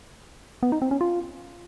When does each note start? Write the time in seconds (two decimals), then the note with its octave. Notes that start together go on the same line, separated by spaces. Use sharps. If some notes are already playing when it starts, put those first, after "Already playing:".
0.63 B3
0.72 D#4
0.82 C4
0.91 C#4
1.01 F4